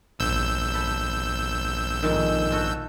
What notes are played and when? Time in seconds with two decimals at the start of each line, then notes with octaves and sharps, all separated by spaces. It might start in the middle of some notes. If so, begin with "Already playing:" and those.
0.19 A#1 E6 G6
0.74 A4 B5
2.02 F2 G#2 D#3
2.51 F4 F#4 A4